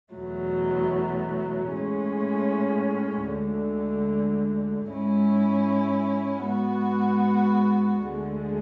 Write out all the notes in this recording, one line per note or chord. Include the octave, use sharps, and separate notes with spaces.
E2 B2 F#3 A3
A2 G#3 C#4
D2 D3 G#3
G#2 G#3 C#4 E4
G#2 G#3 B3 F#4
D2 D3 G#3